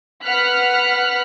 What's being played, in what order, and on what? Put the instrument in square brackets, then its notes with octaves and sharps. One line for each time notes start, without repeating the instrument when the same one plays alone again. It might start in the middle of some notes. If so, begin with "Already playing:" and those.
[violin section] B4 F#5 F6 F#6 B6